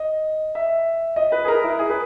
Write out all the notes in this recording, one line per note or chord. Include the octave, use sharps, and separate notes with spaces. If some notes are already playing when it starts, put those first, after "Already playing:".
Already playing: D#5
E5
D#5
B4
G#4
A#4
E4
G#4
B4